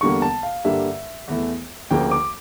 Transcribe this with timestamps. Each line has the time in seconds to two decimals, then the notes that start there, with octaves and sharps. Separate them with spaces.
0.01 E2 D3 G3 A#3 C#6
0.22 A5
0.43 F5
0.65 G2 D3 G3 A#3 E5
1.28 E2 E3 A3
1.91 D2 C#3 F3 A#3 G5
2.11 D6